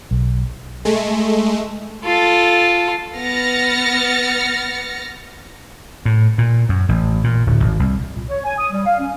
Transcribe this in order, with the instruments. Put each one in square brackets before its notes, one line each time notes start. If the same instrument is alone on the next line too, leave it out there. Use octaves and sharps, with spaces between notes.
[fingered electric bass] B1
[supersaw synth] G#3 A3
[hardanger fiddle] F4 A4
[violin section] B3 F6 A6 A#6 C#7
[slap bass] A2
A#2
F#2
A1
A#2
D1
G#1
C2
[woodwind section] A#2
C#5
G#5
D#6
G3
F5
C#4